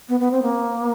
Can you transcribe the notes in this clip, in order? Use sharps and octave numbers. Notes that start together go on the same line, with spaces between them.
B3
B3
C4
A#3